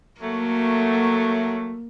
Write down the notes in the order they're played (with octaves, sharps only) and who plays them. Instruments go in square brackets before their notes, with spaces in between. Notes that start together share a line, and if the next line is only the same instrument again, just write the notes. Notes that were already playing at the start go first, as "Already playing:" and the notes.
[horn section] F#3 A3 [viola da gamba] A#3